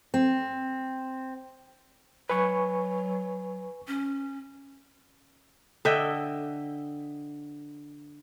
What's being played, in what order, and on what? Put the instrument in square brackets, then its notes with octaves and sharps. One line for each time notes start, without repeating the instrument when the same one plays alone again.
[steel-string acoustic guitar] C4
[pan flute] F#3 [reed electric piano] B4 G#5 C#6
[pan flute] C#4
[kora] D3 D#5 E5 G5